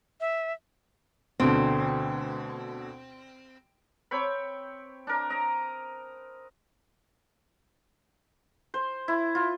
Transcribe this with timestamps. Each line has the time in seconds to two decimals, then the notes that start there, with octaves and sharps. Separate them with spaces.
0.21 E5
1.40 D2 B2 D3 C4
4.11 C4 C#5 G5 B5
5.07 D4 A#4
5.30 D#5 A#5
8.74 C5
9.08 E4
9.35 F4